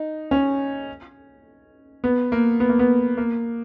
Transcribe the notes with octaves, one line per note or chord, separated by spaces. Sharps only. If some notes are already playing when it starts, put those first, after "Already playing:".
Already playing: D#4
C#4
B3
A#3
B3
A#3
B3
A#3